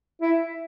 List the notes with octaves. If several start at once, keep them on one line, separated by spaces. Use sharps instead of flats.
E4